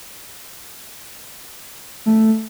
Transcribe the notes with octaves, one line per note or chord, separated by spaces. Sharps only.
A3